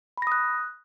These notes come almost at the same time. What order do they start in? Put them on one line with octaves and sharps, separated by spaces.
B5 A#6 D#6 F#6